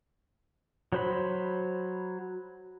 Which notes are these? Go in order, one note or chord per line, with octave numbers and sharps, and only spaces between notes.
F#3 C5 B5